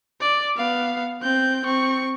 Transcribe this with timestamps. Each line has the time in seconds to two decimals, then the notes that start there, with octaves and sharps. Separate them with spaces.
0.21 D5
0.57 B3 F5
1.22 C4 G6
1.65 C4 C#6